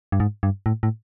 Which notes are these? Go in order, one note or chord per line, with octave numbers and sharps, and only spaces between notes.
G2
G#2
G2
A2
A2